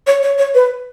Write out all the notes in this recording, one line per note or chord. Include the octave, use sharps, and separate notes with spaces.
C#5
C#5
C#5
B4